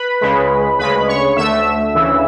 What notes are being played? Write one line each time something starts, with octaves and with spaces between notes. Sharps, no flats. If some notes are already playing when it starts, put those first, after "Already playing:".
Already playing: B4 B5
C#2 C#3 G#3
D2 C#3 G#3 B4 B5
C#5 C#6
D2 D3 A3 E5 E6
D2 C#3 E3